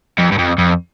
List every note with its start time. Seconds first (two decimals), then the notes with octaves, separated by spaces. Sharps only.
0.19 F2
0.32 G2
0.38 F2
0.58 F2